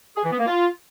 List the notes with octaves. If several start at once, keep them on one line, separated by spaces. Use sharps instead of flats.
G#4
E3
B3
A#3
F4